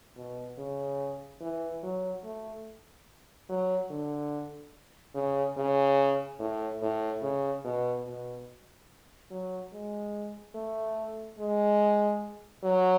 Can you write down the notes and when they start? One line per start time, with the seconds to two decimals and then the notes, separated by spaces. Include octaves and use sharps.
0.16 B2
0.58 C#3
1.41 E3
1.83 F#3
2.24 A3
3.49 F#3
3.90 D3
5.15 C#3
5.57 C#3
6.39 A2
6.82 A2
7.22 C#3
7.65 B2
8.06 B2
9.30 F#3
9.73 G#3
10.55 A3
11.39 G#3
12.64 F#3